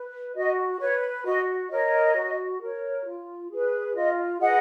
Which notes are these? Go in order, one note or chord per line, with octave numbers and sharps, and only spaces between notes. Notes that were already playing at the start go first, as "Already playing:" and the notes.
Already playing: B4
F#4 D#5
B4 C#5
F#4 D#5
A#4 C#5 D#5
F#4
A#4 C#5
F4
G#4 B4
F4 D#5
G#4 B4 D#5 F#5